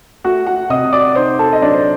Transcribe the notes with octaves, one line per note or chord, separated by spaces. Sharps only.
A3 F#4 F#5
F#4 F#5
C3 D#5 D#6
D5 D6
D#4 C5 C6
A4 A5
D#5
F#3 D4 D5
C5